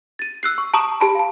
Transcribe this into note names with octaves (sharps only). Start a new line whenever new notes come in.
A6 D#7
E6 F#6 C7
C#6
A5 A#5 C#6 D#6 D7 E7
G4 A5 B5
F5 A5